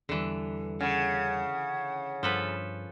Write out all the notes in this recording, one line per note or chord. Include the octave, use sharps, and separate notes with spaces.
E2 D3 E3 G3
C#3 F#5
G2 F3 A4 B4